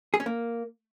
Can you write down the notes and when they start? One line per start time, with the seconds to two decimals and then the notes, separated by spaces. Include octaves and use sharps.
0.14 G#4
0.20 C#4
0.26 A#3